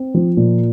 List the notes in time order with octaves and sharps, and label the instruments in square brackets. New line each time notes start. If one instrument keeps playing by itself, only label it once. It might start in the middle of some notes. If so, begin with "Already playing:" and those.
Already playing: [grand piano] C4
F3
A#2